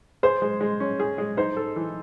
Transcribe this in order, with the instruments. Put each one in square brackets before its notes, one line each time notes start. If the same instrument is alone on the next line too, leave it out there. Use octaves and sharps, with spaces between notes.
[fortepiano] G#4 [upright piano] C5
[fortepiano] G#3
G#3
C#4
G#4
G#3
[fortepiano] D#4 [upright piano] C5
[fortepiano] A4
E3